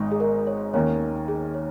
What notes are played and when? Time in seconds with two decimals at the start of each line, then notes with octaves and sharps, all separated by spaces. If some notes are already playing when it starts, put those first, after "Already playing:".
Already playing: G#1 G#2 G#3 D#4
0.11 G#4
0.20 A#4
0.47 C#5
0.74 D#2 D#3 A#3 C#4 C#5
1.28 G#4
1.54 C#5